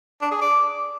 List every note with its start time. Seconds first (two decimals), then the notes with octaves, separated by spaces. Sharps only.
0.21 D4
0.31 G#4
0.41 D5